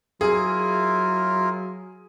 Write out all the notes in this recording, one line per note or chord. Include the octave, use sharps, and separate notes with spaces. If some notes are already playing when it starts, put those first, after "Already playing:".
F#3 E4 F4 G#4 A#4